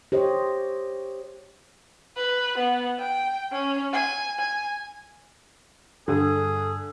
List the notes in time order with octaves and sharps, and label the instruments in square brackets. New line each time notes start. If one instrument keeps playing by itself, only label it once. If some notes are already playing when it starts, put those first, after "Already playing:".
[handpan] G4 C5 C#5 D#5
[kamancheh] B4
B3
G5
C#4
G#5
G#5
[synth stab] G2 [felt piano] D3 [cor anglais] G#4 [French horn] A4